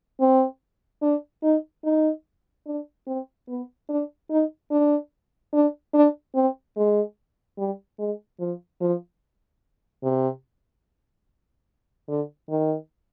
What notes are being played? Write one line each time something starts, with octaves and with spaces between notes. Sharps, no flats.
C4
D4
D#4
D#4
D4
C4
B3
D4
D#4
D4
D4
D4
C4
G#3
G3
G#3
F3
F3
C3
D3
D#3